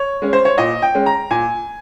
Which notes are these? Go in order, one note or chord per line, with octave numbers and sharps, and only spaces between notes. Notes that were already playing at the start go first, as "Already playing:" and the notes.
Already playing: C#5
G#3 C#4
C5
C#5
A#2 D#5
G5
G#3 C#4
A#5
A#2 G#5